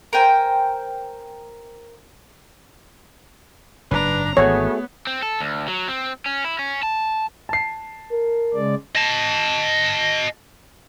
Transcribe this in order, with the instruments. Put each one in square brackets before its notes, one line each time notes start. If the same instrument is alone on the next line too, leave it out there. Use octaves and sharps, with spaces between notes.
[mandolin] A#4 C5 G5 G#5
[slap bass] F#1 G#2 [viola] D4 A#5 [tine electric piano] B4
[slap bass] G#1 E3 [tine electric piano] A3 F#4 G#4 [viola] B3 [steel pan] C#5
[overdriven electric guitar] C4
A4
D2
F#3
C4
C#4
E4
C#4
A5
[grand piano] A5 C7
[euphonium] A#4
[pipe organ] C#3 G#3 D5
[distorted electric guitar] D#5 A5